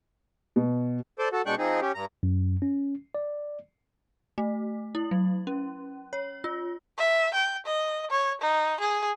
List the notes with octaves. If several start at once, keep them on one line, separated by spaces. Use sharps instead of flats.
B2
A4 C5 D5
F#4 A4
B2 G#3 D4 G5 C#6 F#6
F3 C4 D#4 G#4
C#4 G4
G2 A#5
F#2
C#4
D5
A3
E4
F#3
C#4
C#5
F4
E5
G5
D#5
C#5
D#4
G#4